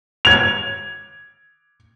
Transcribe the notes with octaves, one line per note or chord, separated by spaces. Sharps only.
G#6 F7